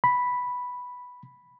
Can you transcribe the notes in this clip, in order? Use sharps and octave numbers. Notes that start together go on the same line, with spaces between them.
B5